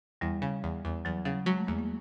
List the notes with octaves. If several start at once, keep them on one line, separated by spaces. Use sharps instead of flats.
E2 G3
C#3
E2
E2
E2 F#3
C#3 F#3
F#3 G#3
A3
E2 A#3
A#3